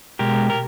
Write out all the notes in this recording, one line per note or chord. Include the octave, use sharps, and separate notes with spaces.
B2 G#3 G4 A#4
A#4